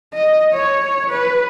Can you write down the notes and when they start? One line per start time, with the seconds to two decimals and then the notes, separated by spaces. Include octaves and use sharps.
0.14 D#5
0.53 C#5
1.10 B4